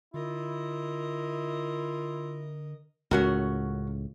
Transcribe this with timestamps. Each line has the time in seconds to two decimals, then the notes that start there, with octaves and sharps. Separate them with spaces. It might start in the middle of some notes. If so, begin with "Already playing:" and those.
0.14 D3 E4 F4 A#4 D#5
3.11 C#2 A2 C#4 F#4 A#4